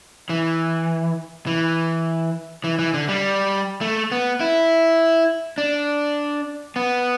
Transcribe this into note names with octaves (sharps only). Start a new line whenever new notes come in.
E3
E3
E3
E3
D3
G3
A3
B3
E4
D4
B3